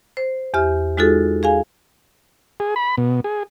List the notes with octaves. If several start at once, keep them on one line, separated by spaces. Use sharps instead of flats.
C5
E2 G4 E5 F6
G#3 D#4 F4 F#4 G#4 A4
G#4 F5 G#5
G#4
B5
B2
G#4